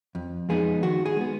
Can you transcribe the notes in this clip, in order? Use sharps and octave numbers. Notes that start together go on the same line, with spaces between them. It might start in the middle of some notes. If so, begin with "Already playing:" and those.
F2
F3 G#3 B3 D#4 G#4
D#3 F#4
G#4
G#3 B3